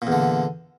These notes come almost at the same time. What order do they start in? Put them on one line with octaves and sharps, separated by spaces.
A#2 E2 D3